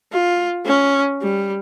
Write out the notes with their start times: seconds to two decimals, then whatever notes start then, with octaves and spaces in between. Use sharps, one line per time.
0.13 F4
0.66 C#4
1.22 G3